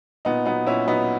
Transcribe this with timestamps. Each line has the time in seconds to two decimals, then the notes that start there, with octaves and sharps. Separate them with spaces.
0.25 A#2 B3 D#4
0.45 F#3 B3 D#4
0.66 A#2 C#4 E4
0.87 F#3 B3 D#4